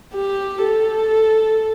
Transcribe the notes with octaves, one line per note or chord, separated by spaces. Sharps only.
G4
A4